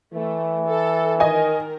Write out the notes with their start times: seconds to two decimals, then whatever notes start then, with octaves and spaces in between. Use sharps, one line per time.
0.14 E3 A3
0.66 A4
1.20 D#3 A#4 D#5 G#5